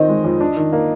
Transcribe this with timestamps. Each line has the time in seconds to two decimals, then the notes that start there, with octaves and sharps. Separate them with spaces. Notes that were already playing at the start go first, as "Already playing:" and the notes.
Already playing: D#3 C4 D#5
0.09 G#3
0.24 F2
0.41 D4
0.56 D#3
0.73 A#3